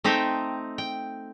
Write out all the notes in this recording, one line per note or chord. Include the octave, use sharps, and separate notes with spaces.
A3 C4 D#4 E5 G5
G5